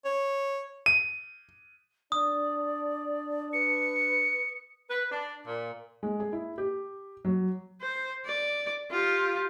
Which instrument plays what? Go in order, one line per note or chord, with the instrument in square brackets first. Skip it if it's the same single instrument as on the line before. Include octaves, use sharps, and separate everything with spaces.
[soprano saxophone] C#5
[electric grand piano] D#7
[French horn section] D4 [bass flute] D5 [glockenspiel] D#6
[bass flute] B4 [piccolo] C#7
[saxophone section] B4
D4
A#2
[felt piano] G#3
G#4
E4
G4
F#3
[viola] C5
D5
F4 G4